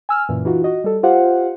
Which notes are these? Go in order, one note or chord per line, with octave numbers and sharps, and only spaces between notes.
G#5 E6 F6
F#2 A#2 E3
E3 D#4 F4 F#4
F#4 D#5
G3 A4
F4 G4 C5 F5 F#5